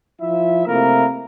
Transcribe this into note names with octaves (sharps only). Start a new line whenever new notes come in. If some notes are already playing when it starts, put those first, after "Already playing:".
F3 E4 E5
C3 A3 A#3 E4 A#4